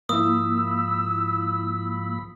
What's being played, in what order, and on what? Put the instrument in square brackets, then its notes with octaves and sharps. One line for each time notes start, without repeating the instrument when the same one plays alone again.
[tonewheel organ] G#2 F3 B5 [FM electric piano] A#3 E4 [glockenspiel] D#6 [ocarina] E6